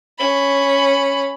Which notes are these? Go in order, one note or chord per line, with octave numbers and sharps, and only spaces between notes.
C#4 B5